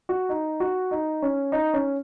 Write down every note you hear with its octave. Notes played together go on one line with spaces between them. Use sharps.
F#4
D#4
F#4
D#4
C#4
D#4
C#4